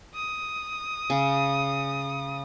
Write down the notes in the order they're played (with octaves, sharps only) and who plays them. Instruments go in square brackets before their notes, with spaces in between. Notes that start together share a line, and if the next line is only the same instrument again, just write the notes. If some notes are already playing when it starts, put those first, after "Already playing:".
[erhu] D#6
[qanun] C#3